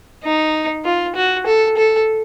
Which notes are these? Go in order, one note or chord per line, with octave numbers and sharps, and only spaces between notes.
D#4
F4
F#4
A4
A4